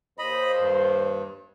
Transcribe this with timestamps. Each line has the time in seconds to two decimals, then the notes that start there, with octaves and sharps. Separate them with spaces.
0.19 D#2 C5 D#5 B5
0.60 G2